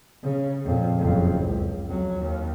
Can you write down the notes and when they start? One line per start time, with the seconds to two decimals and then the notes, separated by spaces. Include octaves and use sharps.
0.23 C#3
0.65 F2 A#2
0.98 F#1 F2
1.43 C#2
1.87 F2 F#3
2.19 D#2